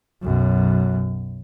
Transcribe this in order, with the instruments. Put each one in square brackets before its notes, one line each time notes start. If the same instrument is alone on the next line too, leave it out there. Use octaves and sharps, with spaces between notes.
[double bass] B1 F#2